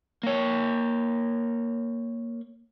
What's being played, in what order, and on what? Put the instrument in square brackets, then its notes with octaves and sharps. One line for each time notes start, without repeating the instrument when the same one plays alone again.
[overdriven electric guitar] A#3 C#5